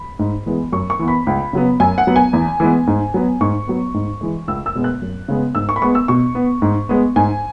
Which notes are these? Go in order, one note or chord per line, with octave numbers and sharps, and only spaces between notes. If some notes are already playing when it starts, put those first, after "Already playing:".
Already playing: B5
G#2
E3 G#3 B3
F#2 C#6
C#6
E3 B3
B5
C#2
C#3 F#3 B3
F#2 G#5
F#5
F#3 B3
G#5
E2
E3 G#3 B3
G#2
F#3 B3
G#2 C#6
F#3 B3
G#2
E3 G#3
C#2 E6
E6
B2 G#3 B3
F#6
F#2
C#3 G#3 B3
G#2 E6
C#6
B5
G#3 B3 C#6
E6
B2 C#6
B3
G#2
G#3 B3
G#2 G#5